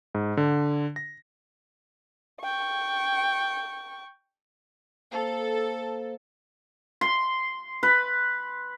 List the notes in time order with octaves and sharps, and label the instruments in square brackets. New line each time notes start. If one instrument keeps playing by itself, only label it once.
[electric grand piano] G#2
D3
A#6
[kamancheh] G5 C#6
[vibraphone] A#3 C5 F5 [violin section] A4
[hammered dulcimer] C6
B4